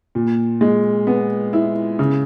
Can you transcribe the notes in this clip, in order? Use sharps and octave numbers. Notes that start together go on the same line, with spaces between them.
A#2
G#3
B3
E4
C#3